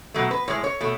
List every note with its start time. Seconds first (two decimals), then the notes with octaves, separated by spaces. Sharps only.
0.14 B2 F#3 A3
0.31 B4
0.48 A2 G#3 C#5
0.64 C#5
0.81 B2 A3